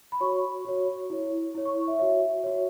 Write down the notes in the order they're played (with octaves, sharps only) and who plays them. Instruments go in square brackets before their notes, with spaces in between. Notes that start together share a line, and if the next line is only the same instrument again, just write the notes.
[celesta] B5
F#4 C#5 C#6
F#4 C#5
E4 C#5
E4 C#5
C#6
E5
F#4 C#5 E5
F#4 C#5